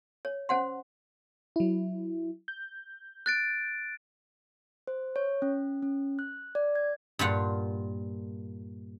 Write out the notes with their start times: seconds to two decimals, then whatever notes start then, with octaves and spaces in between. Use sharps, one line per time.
0.25 C#5
0.49 C#4 C5 F#5 C6
1.56 F#3 E4
2.48 G6
3.26 F#6 A6 D7
4.87 C5
5.16 C#5
5.42 C#4
5.82 C#4
6.19 F#6
6.55 D5
6.75 G#6
7.19 G2 A#2 F4 F#5